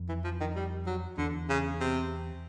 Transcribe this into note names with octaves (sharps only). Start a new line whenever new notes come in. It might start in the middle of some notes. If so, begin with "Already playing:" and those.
Already playing: F2
E3
F3
D#3
G3
F#3
E2 D3
C#3
C3